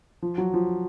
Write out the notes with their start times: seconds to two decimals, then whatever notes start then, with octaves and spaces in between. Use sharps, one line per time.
0.22 F3
0.38 F#3
0.54 F3